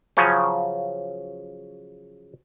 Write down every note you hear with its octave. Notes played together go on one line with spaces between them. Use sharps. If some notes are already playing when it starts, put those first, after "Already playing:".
C#3 F3 F#3 C#4